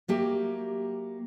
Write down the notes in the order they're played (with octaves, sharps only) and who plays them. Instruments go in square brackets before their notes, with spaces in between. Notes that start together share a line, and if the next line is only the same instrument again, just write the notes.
[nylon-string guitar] F#3 A#3 G4 E5